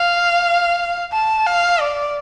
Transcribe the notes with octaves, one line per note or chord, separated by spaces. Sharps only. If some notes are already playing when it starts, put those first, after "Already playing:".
Already playing: F5
A5
F5
D5